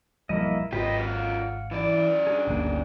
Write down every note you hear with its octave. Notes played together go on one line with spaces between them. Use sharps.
B1 F3 G3 A#3 E4 D#5
G#1 F#2 F4 G4 B4 D#5
F5 F#5
F#2 E3 D5
D4 G#4
G1 D2 A#3